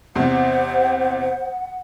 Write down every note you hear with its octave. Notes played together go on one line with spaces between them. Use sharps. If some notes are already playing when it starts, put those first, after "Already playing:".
E2 C3 C4 C5 F#5